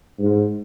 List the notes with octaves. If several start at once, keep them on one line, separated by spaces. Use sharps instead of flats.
G#2